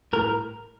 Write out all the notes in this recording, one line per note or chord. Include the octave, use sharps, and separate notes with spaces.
A2 A#4